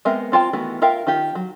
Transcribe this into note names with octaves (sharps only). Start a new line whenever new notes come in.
G#3 B3 C4 A#4 E5
C4 F4 G5 A5
D#3 E3 A3 B3 F#4
F4 A#4 E5 F5 G5
D#3 F4 G4
F#3